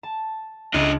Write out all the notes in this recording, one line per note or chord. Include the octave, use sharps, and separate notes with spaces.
A5
C#2 C#4 D4 D#5